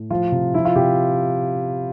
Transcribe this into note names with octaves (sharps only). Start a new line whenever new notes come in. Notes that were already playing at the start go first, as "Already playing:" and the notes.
Already playing: A2
F3 F4
C3
F3 E4
F4
C3 G4